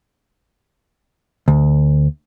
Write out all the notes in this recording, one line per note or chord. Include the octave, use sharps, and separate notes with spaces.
D2